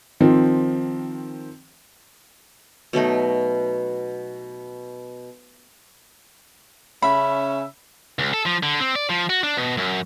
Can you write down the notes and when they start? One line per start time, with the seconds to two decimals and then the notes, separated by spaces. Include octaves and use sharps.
0.20 D#3 F3 C4
2.93 B2 F#3 A3 D#4
7.02 C#3 C#4 E5 B5
8.19 C#2
8.33 A4
8.46 F3
8.63 D3
8.80 C4
8.96 D5
9.09 F3
9.30 F#4
9.43 D4
9.57 B2
9.77 F#2